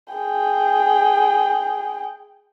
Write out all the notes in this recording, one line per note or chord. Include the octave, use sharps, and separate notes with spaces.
G#4 G5